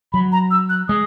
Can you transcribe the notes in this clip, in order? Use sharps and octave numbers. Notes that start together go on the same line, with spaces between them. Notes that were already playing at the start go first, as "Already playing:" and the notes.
F#3 B5
A#5
E6
F#6
G#3 D#6